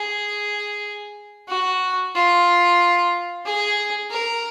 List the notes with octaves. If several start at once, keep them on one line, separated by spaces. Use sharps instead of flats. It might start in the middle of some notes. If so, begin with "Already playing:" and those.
Already playing: G#4
F#4
F4
G#4
A#4